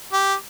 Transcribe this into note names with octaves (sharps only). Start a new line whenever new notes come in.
G4